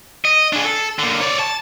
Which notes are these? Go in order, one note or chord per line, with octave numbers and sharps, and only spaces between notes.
D#5
D4 G#4
A4
D3 A#3
C#5 D5
A5